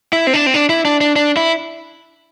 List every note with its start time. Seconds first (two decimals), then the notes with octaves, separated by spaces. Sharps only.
0.13 E4
0.27 C4
0.34 D4
0.46 C4
0.54 D4
0.69 E4
0.85 D4
1.01 D4
1.16 D4
1.37 E4